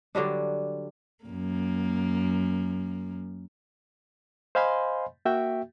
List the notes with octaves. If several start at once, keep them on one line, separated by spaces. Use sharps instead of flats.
D3 F#3 G3 D4
F#2 A#3
C5 D#5 F5 G#5 B5 C6
A#3 F#4 E5 G5